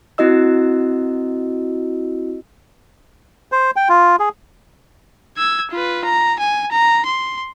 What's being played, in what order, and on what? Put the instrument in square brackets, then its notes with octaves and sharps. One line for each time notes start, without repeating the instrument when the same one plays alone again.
[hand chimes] C4 E4 F#4 D#5 E6
[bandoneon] C5
G5
F4
G#4
[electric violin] E6 G#6
F4 B4
A#5
G#5
A#5
C6